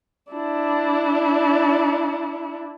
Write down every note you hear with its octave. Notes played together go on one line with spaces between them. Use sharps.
D4 E4